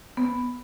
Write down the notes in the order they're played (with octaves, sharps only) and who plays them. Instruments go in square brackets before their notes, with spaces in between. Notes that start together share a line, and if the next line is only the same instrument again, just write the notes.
[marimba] B3